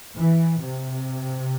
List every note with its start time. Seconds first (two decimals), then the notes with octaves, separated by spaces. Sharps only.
0.18 E3
0.61 C3